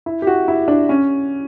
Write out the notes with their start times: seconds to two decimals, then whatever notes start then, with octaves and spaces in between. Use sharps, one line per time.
0.06 E4
0.22 G4
0.27 F#4
0.48 E4
0.68 D4
0.89 C#4